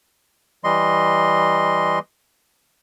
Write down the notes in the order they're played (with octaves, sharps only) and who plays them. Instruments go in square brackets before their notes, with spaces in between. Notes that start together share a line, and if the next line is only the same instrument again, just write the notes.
[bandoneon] E3 G3 D#5 C6